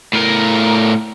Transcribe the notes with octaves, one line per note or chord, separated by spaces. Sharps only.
A2 A#4